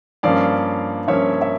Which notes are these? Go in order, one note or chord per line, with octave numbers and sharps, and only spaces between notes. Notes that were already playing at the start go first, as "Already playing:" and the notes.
G2 F3 A#3 C#4 D5 F5
G2 F3 A#3 C#4 C#5 E5
E5